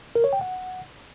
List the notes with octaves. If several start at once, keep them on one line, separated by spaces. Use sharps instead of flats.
A#4
C#5
G5
F#5